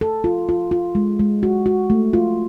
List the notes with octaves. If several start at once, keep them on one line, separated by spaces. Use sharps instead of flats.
A4
F4
F4
F4
G#3
G#3
F#4
F#4
A3
F4